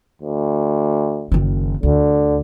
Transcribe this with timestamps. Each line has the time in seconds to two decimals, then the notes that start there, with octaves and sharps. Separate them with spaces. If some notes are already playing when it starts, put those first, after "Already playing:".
0.22 D2
1.32 F#1 D#3
1.83 D2 D3